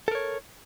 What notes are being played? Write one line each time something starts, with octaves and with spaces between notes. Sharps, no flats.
A4 A#4 C#5